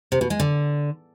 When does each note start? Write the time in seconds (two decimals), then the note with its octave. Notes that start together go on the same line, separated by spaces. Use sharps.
0.12 C3
0.21 B2
0.30 G#3
0.40 D3